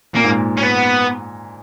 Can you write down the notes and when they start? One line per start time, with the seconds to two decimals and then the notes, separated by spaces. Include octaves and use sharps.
0.15 A#2 A#3
0.24 G#2
0.32 A#2
0.58 C#4
0.63 B3